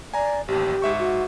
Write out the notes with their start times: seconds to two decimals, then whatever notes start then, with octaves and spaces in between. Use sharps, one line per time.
0.14 D5 G#5 A#5
0.48 A1 D#2 G4
0.82 G#2 E5 C#6
0.99 F#4